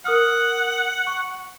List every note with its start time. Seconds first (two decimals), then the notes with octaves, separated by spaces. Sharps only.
0.05 A#4 F#5 D#6 F6
1.07 C#6 C#7